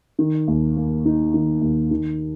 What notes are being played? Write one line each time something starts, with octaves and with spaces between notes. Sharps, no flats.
D#3
D#2
A#3
D#4
D#3
D#2
D#3